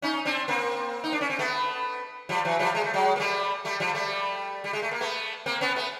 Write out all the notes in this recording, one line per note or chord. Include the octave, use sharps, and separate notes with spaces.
C#4 D#4
C4 D4
A#3 C4
D#4
D4
C#4
C4
A3 B3
F3 G3
E3 F#3
F3 G3
G#3
A3
F#3 G#3
A#3
G3 A3
G3 A3
F3 G3
G3 A3
G3
G#3
A3
A#3
A3 B3
A#3 C4
B3 C#4
A3 B3